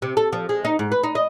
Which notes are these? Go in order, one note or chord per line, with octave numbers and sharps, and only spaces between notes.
C3
A4
F3
G#3
D#4
G#2
B4
D#4
D#5